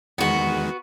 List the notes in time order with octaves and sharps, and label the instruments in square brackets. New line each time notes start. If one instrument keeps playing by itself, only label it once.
[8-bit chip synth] E2 D#3 G#3 [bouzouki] B3 F#4